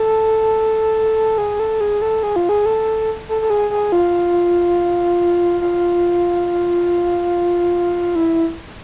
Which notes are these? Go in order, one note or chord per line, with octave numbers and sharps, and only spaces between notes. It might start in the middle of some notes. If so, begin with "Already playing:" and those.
Already playing: A4
G#4
A4
G#4
A4
G#4
F4
G#4
A4
A4
A4
G#4
G#4
F4
F4
E4